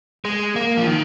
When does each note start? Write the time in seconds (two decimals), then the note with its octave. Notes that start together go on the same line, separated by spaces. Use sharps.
0.25 G#3
0.56 A#3
0.77 F3
0.87 D#3